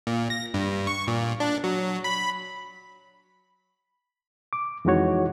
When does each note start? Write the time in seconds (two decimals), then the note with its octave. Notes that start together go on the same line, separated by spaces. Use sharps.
0.07 A#2
0.30 A#6
0.54 G2
0.87 C#6
1.08 A#2
1.40 D4
1.64 F#3
2.04 B5
4.53 D6
4.85 F2 E3 G#3 D#4 F#4 C#5